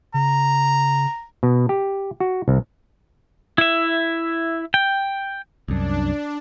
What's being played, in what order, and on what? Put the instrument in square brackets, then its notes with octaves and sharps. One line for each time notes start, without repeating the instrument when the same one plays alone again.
[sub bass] C#3 [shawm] A#5
[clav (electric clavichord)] B2
G4
F#4
C2
[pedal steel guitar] E4 E5
G5
[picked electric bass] C2 F#2 [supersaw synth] D4